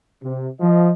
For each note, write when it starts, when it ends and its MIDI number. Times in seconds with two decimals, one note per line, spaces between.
0.22 0.47 48
0.60 0.90 53
0.60 0.90 75